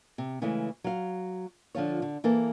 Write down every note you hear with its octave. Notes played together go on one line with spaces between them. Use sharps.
C3
C#3 E3 G#3 A3 C#4 E4
F#3 F5
D3 F3 F4 C#5
D3
E3 A#3 A4 B4